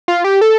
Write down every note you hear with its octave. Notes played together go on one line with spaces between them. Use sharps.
F4
G4
A4